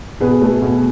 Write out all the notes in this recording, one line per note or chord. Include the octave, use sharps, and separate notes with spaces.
B2 G#4 B4
A3
B2